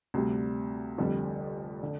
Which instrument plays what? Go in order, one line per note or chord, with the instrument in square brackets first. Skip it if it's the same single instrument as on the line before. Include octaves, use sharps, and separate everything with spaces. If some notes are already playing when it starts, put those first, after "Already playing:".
[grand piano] D2 C3 G3
F1 F2 D3 G3
D3